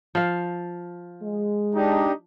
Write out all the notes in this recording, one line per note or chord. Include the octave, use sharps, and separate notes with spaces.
F3 F5
G#3
D4 D#4 G4